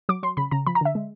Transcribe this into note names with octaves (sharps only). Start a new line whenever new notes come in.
F#3 D6
F#3 C6
C#3 B5
C#3 A#5
F3 B5
A#5
D3 E5
G#3